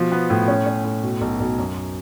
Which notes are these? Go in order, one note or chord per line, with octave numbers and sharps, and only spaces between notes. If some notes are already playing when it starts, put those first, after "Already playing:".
Already playing: B2 F3
B3
A2
C#4
C#4
A2
B2
B1
B1
F#2